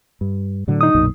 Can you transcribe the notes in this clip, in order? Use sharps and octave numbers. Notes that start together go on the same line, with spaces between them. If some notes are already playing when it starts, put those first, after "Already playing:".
G2
A2 D3 F#3
D#4 D#6
B1 F#2 A#2